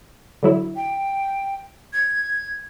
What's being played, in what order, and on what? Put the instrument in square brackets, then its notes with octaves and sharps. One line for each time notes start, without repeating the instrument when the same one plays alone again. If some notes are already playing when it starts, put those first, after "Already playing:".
[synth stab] D3 F#3 E4
[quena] G5
G#6